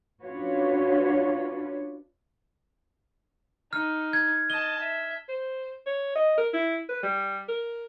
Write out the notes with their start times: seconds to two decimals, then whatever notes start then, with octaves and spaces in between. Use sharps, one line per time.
0.22 C#4 D4 F4 F#4 B4 C#5
3.73 D#4 F6
4.13 G#6
4.50 D#5 A5 G7
4.80 E5
5.29 C5
5.87 C#5
6.15 D#5
6.38 A#4
6.54 E4
6.89 B4
7.03 G3
7.48 A#4